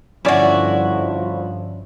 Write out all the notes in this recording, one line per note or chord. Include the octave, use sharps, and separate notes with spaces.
G2 D3 F3 C#4 E4 F#4 D5